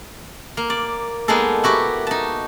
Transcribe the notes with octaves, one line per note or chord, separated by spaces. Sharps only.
A#3
D5
G#3 A#3 B3 D#4 G#4 A4
E4 F#4 G4
D#4 A5